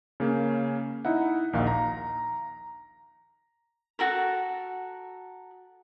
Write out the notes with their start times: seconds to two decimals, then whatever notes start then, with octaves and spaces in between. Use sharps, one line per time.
0.20 C#3 A#3 C#4
1.05 D#4 E4 E5 F#5
1.53 A#1 D#2 D#4 F5
1.67 A#5
3.99 F#4 A4 A#4